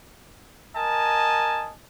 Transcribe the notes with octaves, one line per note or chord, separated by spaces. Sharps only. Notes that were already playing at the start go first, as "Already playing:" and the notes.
A#4 D#5 G#5 A5